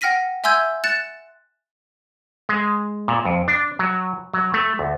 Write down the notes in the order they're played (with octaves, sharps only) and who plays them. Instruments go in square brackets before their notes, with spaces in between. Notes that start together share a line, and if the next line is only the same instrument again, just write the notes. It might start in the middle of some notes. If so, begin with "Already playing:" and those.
[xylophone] F#5 G5 F6 A#6 B6 D#7
E5 G#5 C6 E6 G6 G#6
F#6 A6 C#7 E7
[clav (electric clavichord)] G#3
A#2
F2
D4
F#3
F#3
A3
D2